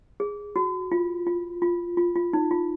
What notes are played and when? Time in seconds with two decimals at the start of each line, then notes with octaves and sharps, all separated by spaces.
0.20 G#4
0.56 F#4
0.92 F4
1.26 F4
1.62 F4
1.97 F4
2.16 F4
2.33 D#4
2.51 F4